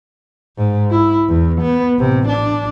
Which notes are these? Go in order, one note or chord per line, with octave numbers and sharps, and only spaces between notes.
G#2
E4
E2
B3
A1 C3
D4